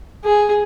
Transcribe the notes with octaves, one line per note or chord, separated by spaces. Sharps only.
G#4